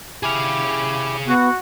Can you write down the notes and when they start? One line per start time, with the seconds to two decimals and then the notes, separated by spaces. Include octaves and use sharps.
0.23 E4 G4 G#4 F5
1.27 B3 F#4